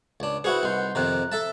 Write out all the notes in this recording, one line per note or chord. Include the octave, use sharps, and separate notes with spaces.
C#2 D4
E4 F#4 G#4 B4 C5 F#6
C2 D#4 F#5 C6 G6
F2 C3 D#3 A#5 F#6
A4 E5 A5